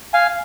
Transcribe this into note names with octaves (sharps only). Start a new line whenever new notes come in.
F5 G#5